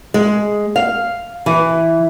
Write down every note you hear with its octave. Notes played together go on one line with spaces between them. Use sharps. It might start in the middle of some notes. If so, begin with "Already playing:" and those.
G#3
F5
E3